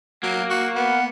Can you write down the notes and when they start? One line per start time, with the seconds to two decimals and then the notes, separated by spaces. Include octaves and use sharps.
0.23 F#3 A#3
0.50 F#4
0.75 B3 F#5